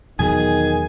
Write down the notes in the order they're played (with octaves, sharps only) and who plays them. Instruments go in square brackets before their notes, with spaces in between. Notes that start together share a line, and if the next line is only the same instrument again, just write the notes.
[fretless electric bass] E2 B2 F#3 [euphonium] D#3 [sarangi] G#4 [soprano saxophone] G#5